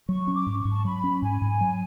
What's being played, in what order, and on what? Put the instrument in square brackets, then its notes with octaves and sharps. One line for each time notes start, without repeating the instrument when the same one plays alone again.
[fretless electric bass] F#3 [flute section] C#6
[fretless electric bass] C#4
[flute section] D6
[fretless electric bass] G#2
[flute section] C#6
[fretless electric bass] G#2
[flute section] A5
[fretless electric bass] F#3 [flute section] B5
[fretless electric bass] C#4
[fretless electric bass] G#2 [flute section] G#5
[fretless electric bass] G#2
F#3